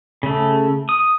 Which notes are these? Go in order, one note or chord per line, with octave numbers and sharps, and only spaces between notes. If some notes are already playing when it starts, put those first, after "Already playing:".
C#3 A3
D#6